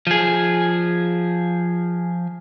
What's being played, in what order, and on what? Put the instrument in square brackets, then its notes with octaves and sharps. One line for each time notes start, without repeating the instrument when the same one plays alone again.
[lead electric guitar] F3 G#4